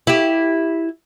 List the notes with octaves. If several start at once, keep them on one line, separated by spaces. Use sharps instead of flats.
E4 G4